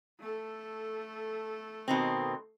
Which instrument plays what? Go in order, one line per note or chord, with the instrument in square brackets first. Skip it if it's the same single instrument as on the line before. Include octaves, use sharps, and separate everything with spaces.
[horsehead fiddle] A3 A4
[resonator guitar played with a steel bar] B2 D#3 C4